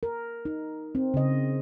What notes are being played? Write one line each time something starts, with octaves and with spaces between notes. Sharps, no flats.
A#4
D#4
C4
C#3 D#5